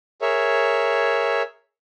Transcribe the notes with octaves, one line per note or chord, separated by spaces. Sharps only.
G#4 A#4 C#5 E5